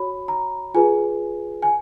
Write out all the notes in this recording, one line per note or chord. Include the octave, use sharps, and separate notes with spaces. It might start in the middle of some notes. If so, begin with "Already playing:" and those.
Already playing: F#4 C#5 B5
A#5
F4 G#4 B4 G#5
G#5